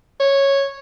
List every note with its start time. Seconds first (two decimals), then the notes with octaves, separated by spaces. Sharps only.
0.20 C#5